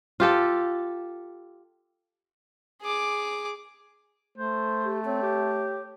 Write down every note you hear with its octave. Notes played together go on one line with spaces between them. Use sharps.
F4 G4 A4
G#4 D6
A3 C5
G4
C4 C#5
G4